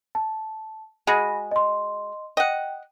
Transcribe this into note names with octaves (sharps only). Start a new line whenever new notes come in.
A5
G#3 F#4 G#4 G#5 B5 A#6
D#5 C6
D#5 F#5 G5